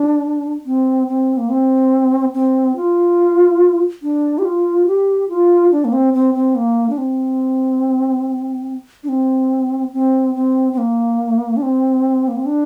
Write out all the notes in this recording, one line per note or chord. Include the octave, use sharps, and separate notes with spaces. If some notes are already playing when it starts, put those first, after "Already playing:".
Already playing: D4
C4
C4
A#3
C4
C4
F4
D4
G4
F4
G4
F4
D4
A#3
C4
C4
C4
A#3
D4
C4
D4
C4
C4
C4
C4
A#3
D4
C4
A#3
C4
D4